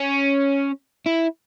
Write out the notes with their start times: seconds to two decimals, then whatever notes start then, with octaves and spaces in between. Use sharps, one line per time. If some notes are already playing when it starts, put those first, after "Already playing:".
Already playing: C#4
1.06 E4